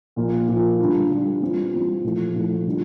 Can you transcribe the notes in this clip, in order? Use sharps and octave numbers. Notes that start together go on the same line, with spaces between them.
A#2 F3 A#3 F4
A#2 F3 A#3 F4
D3 G3 D4 F4
D3 G3 D4 F4
E3 G3 C4 F4
E3 G3 C4 F4
A#2 F3 A3 E4
A#2 F3 A3 E4
D3 G3 D4 F4